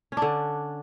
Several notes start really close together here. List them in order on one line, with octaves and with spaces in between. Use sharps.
C#4 D4 D3